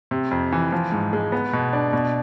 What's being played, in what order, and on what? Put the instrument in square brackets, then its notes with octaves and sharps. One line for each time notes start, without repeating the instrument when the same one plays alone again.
[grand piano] C3
F2
E3
F3
G#2
G#3
B3
B2
D4
B2